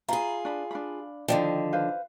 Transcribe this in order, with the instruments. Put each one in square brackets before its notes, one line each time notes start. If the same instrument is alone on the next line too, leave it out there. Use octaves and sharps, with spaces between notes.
[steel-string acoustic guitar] F4 G#4 [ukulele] A#5 B5
[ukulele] D4 B5
D4 F5 B5
[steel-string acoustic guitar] D3 D#3 F3 [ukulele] E4 D5 G5
[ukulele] B4 C5 F5